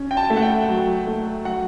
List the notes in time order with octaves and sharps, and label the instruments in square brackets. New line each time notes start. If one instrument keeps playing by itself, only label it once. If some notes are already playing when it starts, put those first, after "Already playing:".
Already playing: [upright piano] C#4
[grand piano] G5
A5
[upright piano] A3
[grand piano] F#5
G5
[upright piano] F#3
A3
[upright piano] F#3 [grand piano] F#5